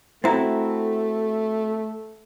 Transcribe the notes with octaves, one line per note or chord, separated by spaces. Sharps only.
A3 C4 E4 F#4 A#5 B5